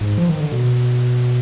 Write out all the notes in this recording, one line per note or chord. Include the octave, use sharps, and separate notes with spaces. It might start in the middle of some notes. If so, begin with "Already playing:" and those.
G#2
F3
D#3
D3
B2